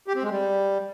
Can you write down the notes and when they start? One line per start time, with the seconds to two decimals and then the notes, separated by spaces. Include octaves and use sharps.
0.07 G4
0.15 C4
0.23 G#3
0.31 G3